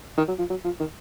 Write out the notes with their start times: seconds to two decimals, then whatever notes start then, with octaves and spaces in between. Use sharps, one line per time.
0.17 D#3
0.28 F#3
0.38 F3
0.50 F#3
0.65 F3
0.80 D#3